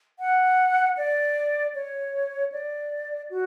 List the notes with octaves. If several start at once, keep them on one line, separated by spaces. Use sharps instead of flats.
F#5
D5
C#5
D5
F#4